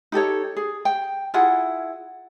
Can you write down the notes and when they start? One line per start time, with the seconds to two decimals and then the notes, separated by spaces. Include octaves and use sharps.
0.12 D#4 G4 A4 C#5
0.57 G#4
0.85 G5
1.34 E4 F4 G#4 F#5